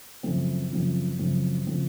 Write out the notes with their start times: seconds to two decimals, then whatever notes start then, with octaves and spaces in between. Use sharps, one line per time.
0.23 F#2 C#3 F3 A3 C4
0.71 F#2 C#3 F3 A3 C4
1.19 F#2 C#3 F3 A3 C4
1.67 C#3 F3 A3 C4